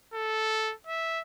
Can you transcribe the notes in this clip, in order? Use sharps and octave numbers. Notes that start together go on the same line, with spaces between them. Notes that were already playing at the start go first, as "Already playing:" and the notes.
A4
E5